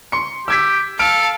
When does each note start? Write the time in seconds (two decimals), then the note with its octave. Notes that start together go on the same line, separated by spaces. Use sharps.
0.12 C6 C#7
0.48 G4 E6 G#6 B6
0.99 A4 F5 A5 F6 D7